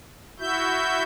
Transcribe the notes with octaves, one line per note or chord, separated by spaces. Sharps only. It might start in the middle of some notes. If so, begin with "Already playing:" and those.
E4 F#4 E5 G6